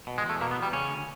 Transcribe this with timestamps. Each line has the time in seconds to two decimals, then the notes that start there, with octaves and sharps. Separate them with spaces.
0.07 B2
0.18 G#3
0.24 E2
0.29 A3
0.41 B2 A#3
0.51 B3
0.57 E2
0.62 G3
0.73 C#3 C#4
0.90 D2